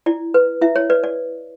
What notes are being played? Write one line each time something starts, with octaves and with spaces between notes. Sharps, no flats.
E4 D5
B4
E4 E5
C#5
B4 D5
D5